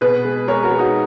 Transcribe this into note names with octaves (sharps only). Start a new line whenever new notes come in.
B2 G#4 B4
G#3
G#3 A#4 C#5
F#4 A#4
G#3
D#4 F#4